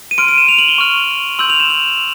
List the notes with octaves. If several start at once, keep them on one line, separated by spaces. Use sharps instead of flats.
D#7
C6 F6 D7
D#7
E7
F7
F#7
G7
C#6 F6
C6 E6 G6 F#7
F7
E7
F#7